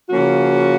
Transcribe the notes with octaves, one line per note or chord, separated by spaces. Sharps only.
C#3 F3 A#3 C#4 F#4